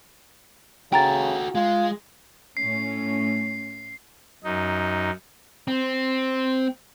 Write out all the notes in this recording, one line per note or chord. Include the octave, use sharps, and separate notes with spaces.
C#3 F#4 A4 G5 A#5 A6
G#3 F4
A2 A3 C#4 C7
F#2 D#4
C4